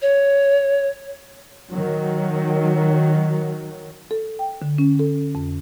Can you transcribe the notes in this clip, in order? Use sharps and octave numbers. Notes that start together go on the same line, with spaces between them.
C#5
D#3 F#3
A4
G5
D3
C#4
A4
F2